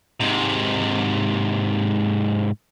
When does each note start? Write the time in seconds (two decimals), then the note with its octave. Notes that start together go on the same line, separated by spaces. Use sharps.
0.20 G#2 C3